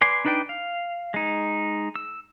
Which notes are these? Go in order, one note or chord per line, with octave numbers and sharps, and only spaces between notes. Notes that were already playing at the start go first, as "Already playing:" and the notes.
B4 D5 G#5 C6
D4 D#4 B4 D5 G5
F5
G#3 D#4
E6